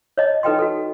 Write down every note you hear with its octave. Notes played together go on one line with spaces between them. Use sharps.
C#5 D#5 A5
D#4 A4 B4 D#5 G5 C6
F#4 A4